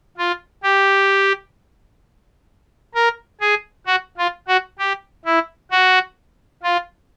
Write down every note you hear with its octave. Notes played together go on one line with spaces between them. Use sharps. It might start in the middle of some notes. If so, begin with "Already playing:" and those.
F4
G4
A#4
G#4
F#4
F4
F#4
G4
E4
F#4
F4